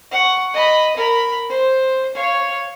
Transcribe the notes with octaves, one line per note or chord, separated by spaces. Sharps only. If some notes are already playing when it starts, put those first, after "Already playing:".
F#5 C#6
D#5 B5
A#4 B5
C5
C#5 F5